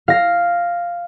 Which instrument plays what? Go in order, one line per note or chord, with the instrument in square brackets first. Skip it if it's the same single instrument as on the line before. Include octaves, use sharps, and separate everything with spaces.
[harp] F5 A#6